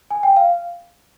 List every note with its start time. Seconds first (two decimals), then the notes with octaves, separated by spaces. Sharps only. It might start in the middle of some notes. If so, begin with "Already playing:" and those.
0.11 G#5
0.23 G5
0.37 F5